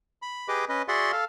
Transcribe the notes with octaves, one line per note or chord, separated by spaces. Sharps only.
B5
G4 G#4 B4 D#5 D6
C#4 B4 D#5
F#4 G#4 D5 E5 F#5 C6
A4 F5